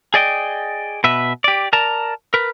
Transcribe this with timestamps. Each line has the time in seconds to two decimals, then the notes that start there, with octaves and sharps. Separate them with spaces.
0.14 G#4 D5 D#5 G5
1.04 B2 B4 E5
1.44 G4 D5
1.73 A#4 D5 A5 A#5
2.34 A#4 B4